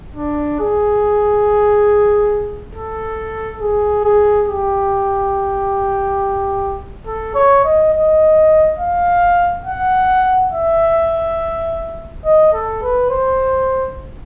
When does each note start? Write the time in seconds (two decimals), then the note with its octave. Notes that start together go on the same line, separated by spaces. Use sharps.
0.16 D4
0.60 G#4
2.75 A4
3.61 G#4
4.04 G#4
4.48 G4
7.07 A4
7.35 C#5
7.65 D#5
7.94 D#5
8.79 F5
9.65 F#5
10.52 E5
12.25 D#5
12.53 A4
12.83 B4
13.10 C5